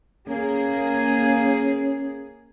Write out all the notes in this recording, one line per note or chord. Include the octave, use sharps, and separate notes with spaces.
A#3 C#4 G#4